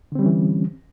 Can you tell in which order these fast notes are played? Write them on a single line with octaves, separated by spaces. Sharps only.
D3 C4 G3 C#4 E3